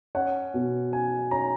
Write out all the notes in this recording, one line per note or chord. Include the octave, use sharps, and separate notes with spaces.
C#4 F#5
B2
C#4 G#5
C#4 A#5